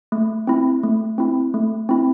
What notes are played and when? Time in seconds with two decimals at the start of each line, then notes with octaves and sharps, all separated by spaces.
0.12 A3
0.47 C4 E4
0.83 A3
1.18 C4 E4
1.54 A3
1.89 C4 E4